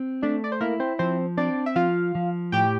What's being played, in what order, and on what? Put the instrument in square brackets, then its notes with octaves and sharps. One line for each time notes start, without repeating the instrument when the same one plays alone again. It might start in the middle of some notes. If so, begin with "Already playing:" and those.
Already playing: [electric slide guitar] C4
[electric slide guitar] A3 [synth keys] D4 D5
[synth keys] D5
C5
[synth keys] A#3 A#4 [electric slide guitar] E4
[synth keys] C4 C5
[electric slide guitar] F3 [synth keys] C4 C5
[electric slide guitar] C4 [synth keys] D4 D5
[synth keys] E5
[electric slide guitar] F3 [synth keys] F4 F5
[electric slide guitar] F3
[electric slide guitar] A2 [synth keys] G4 G5